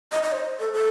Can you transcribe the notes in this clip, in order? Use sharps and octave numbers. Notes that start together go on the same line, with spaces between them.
D#5
D#5
C5
A4
A4